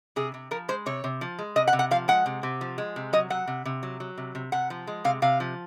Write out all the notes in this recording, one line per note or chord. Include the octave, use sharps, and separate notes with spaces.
C3 G#4
C3
F3 A#4
G#3 C5
C3 C#5
C3
F3
G#3
C3 D#5
F#5
C3
F#5
F3 F5
G#3 F#5
C3
C3
F3
G#3
C3
F#3 D#5
F#3 F#5
C3
C3
F#3
F#3
C3
C3
C3 F#5
F3
G#3
C3 F5
C3 F5
F3